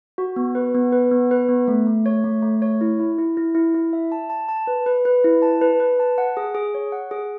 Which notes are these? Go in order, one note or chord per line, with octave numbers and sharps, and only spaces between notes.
F#4
B3
B4
B3
B4
B3
B4
B3
A3
A3
C#5
A3
A3
C#5
E4
E4
E4
E4
E4
E4
E5
A5
A5
A5
B4
B4
B4
E4
A5
B4
B4
A5
F#5
G#4
G#4
C#5
F#5
G#4